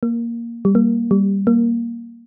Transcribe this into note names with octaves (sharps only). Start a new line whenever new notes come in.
A#3
G3
A#3
G3
A#3